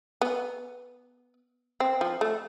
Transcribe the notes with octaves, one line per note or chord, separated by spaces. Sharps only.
B3
C4
F3
A3